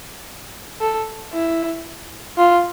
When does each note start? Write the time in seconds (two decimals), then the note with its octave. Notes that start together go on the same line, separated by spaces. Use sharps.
0.81 A4
1.33 E4
2.38 F4